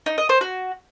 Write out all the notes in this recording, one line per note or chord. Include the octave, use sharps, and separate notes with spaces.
D#4
D#5
C5
F#4